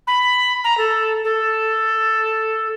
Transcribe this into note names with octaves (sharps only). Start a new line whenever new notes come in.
B5
A#5
A4
A4